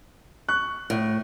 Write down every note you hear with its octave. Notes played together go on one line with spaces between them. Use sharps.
C#6 F#6
A2